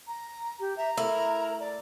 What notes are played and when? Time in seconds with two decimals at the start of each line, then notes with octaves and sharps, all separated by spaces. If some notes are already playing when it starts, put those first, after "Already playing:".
0.07 A#5
0.60 G4
0.77 E5 A#5
0.98 A3 E4 A#4
1.60 D5